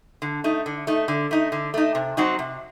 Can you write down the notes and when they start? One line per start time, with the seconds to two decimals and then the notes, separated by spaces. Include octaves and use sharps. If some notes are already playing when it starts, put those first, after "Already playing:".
0.22 D3
0.44 A3 D#4
0.66 D3
0.87 A3 D#4
1.08 D3
1.31 A3 D#4
1.52 D3
1.74 A3 D#4
1.95 C3
2.17 F#3 C4 D#4 F#4
2.39 C3